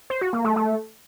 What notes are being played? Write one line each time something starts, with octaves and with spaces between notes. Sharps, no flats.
C5
F#4
A#3
A3
A3